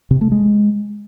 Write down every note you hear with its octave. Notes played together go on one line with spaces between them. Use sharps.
C3
A3
G#3